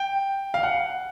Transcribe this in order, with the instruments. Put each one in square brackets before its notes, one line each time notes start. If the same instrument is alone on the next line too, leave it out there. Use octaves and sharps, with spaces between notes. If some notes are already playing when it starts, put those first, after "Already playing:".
Already playing: [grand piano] G5
F5
F#5